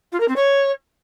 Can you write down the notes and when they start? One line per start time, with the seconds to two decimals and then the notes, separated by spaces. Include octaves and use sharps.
0.12 F4
0.20 A#4
0.28 C4
0.36 C#5